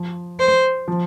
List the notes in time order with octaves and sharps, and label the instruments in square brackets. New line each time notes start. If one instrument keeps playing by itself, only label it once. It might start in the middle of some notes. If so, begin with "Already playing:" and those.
Already playing: [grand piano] F3
[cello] C5
[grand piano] F3